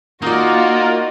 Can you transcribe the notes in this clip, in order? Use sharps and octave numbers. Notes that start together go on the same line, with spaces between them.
A#3 D#4 F4 F#4 D5